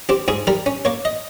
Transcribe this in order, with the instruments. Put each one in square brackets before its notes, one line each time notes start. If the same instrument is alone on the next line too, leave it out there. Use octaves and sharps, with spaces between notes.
[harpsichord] C4 G4
G#2 G#4
G3 A#4
C#4
A#3 C#5
D#5